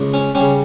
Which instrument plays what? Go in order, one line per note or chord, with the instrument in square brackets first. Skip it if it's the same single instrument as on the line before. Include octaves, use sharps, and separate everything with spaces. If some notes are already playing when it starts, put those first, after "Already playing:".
Already playing: [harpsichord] C#2
C#4
C#3 G3 C#4